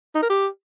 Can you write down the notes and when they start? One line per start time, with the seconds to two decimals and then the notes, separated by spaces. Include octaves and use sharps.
0.15 D#4
0.22 A#4
0.30 G4